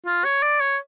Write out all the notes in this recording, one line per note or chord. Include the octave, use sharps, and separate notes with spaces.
F4
C#5
D5
C#5